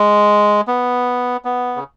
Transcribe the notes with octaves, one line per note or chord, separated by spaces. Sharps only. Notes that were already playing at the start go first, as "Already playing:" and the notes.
Already playing: G#3
B3
B3
C#3